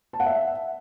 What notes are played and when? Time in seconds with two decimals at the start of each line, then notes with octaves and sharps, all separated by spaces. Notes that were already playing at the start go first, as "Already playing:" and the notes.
0.13 A5
0.20 F#5
0.26 E5